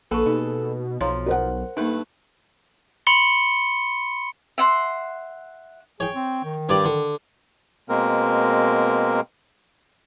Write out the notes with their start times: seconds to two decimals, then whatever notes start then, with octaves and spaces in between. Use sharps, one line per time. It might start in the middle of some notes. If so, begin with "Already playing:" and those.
0.11 A#1 A#3 G#4 A4 B4 C#6
0.26 B2 D#4 G4
1.01 B1 F3 C#5 F5 A#5
1.26 A#4 C5 F#5
1.77 G2 A3 A#3 D#4 B4
3.07 B5 C6 C#7 G7
4.58 E5 F#5 C6
6.00 G#4 C#5 G5
6.15 C4
6.44 D#3
6.69 G2 G4 D5
6.85 D3
7.89 B2 G#3 A#3 C4 A#4